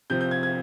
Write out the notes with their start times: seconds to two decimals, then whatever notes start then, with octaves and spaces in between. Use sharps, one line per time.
0.10 C3 F3 C4 G6
0.21 G6
0.31 G#6
0.43 G#6